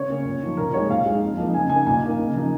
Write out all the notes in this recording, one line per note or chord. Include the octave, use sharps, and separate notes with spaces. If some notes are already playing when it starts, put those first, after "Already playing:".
Already playing: C#3 C#5
A#3 C#4
A#2
F3 A#3 D#4
A#2 A#4
G#3 D#4 C#5
A#2 F5
G#3 D#4
F2
F3 A#3 D#4
C#3 G#5
A#3 D#4 G#5
A#2 G#5
A#3 D#4
C#3
F3 A#3 D#4